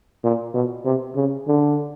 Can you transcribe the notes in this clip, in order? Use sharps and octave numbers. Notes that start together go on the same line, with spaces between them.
A#2
B2
C3
C#3
D3